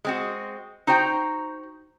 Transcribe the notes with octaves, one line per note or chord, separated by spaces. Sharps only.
G#3 C4 F#4
D#4 F#4 C5 G5 A#5